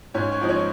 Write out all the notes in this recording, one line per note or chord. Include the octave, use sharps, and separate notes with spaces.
G#2 C#4 C#5
C#4 C#5
F3 C4 D#4
C#4 C#5